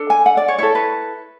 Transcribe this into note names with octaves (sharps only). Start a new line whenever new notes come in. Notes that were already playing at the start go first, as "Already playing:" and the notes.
Already playing: D4 A4
G#5
F#5
D5
C#5
E4 A4 C#5
B4